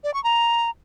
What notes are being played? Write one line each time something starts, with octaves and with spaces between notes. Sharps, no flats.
D5
C#6
A#5